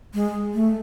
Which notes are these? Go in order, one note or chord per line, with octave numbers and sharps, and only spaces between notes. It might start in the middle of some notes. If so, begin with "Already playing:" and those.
G#3
A3